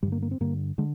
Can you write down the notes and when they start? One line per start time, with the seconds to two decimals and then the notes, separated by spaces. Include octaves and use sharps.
0.03 G2 D3 G3
0.12 A#3
0.22 A#3
0.31 C4
0.40 G2 D3 A#3
0.78 D3 G#3